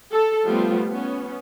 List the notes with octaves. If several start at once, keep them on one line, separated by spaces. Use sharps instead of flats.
A4
F3 G3 A3 B3 F4
B3 C#4